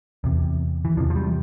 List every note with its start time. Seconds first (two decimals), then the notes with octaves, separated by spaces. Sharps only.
0.24 E2 C3
0.85 E3
0.97 E2 C3 F3
1.10 F3
1.16 G3